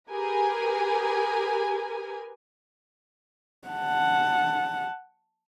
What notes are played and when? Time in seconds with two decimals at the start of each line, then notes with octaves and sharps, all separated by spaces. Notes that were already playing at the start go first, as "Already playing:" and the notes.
0.11 G4 G#4 A#4 B4 G#5
3.68 F#5 A5